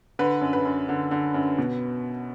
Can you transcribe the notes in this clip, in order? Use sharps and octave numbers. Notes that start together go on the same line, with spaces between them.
D3 B4
F#2
B4
F#2
D3
D3
F#2
B2